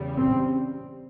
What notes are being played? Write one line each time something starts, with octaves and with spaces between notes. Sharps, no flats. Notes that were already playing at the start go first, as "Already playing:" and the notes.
Already playing: E2 C#3 G3
C4